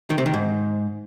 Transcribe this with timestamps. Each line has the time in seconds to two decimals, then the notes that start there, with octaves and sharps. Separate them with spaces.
0.10 D#3
0.18 C3
0.26 D#3
0.34 G#2